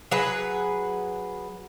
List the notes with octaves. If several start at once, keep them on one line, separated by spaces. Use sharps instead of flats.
F#3 G#4 B4 F#5